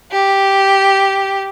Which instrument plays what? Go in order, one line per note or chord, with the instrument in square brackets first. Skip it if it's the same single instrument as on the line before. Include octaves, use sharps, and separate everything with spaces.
[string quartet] G4